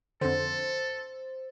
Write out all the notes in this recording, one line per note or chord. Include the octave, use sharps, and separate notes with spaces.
F2 D3 A4 C5